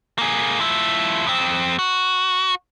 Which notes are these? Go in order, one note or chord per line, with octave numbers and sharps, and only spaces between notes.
A#3 G#4
F3 E4
F2 C4
F#4